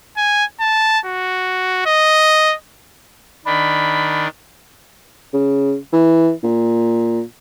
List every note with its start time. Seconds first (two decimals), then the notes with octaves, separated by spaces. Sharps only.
0.17 G#5
0.60 A5
1.06 F#4
1.86 D#5
3.46 D#3 D4 B5
5.33 C#3
5.93 E3
6.43 A#2